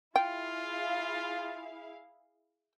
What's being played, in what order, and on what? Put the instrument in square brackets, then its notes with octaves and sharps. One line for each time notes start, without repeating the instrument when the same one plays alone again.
[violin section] E4 G#4 F5 [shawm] F4 [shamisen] G5